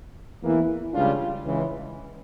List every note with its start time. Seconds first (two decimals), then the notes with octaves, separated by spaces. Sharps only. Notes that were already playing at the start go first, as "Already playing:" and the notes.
0.42 E2 E3 A#3 E4
0.93 C#2 C#3 G3 D4 F4
1.45 C#2 C#3 E3